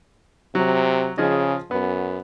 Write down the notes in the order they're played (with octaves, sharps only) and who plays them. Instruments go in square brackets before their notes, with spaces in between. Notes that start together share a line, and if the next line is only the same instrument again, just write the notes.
[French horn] C3 [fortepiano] F#3
[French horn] C#3 [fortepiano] F3 G#4 D#5
[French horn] F#2 [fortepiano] B3